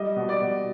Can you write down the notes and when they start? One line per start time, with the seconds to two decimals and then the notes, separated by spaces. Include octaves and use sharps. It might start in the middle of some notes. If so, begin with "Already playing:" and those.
Already playing: G3 D#5
0.16 B2
0.29 D5
0.41 B2